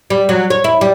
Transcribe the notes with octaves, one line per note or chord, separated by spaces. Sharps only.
G3
F#3
C#5
E4
G3